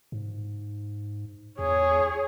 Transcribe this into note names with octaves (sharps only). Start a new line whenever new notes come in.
G#2
E2 G#4 C#5